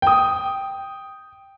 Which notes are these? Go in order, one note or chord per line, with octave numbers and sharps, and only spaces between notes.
G5 D#6